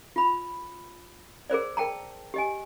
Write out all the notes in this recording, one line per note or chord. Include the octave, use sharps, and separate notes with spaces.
F4 B5
G#4 A#4 C5 D5
A#4 G5 A5 A#5
G4 D#5 G#5